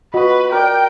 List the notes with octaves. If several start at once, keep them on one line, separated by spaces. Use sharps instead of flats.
F4 F#4 B4 D#5
A#4 D5 G5